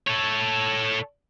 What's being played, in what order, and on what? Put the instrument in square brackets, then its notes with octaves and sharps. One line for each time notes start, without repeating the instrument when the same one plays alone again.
[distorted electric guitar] A4 C#5